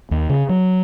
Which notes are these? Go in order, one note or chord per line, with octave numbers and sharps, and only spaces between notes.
D#2
C#3
F#3